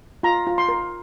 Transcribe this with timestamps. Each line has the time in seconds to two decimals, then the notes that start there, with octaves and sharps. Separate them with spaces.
0.23 F4 A#5
0.47 F4
0.58 C6
0.69 A#4